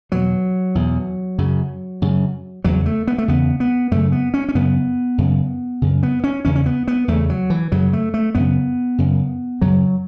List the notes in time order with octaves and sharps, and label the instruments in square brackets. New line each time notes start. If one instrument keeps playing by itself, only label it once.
[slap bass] E2 B2 F#3
E2 B2
F#2 C#3
F#2 C#3
E2 C#3 F#3
A3
B3
A3
E2 C#3 B3
B3
F#2 C#3 A3
B3
C#4
C#4
F#2 C#3 B3
F#2 C#3
F#2 C#3
B3
C#4
E2 C#3 C#4
C#4
B3
B3
E2 C#3 A3
F#3
E3
F#2 C#3 F#3
A3
A3
F#2 C#3 B3
F#2 C#3
F#2 C#3 F#3